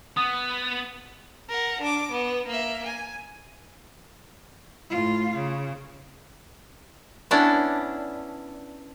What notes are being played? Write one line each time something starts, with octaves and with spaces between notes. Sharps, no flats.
B3 D#6
A#4 F#5
D4 D6
B3
A#3 E5
G#5
A2 F4
C#3
B3 C#4 D4 E4 D5